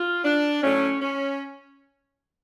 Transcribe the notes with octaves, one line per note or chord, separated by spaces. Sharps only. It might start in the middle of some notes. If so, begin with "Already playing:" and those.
Already playing: F4
D4
A2 F#3 A3 C#4
C#4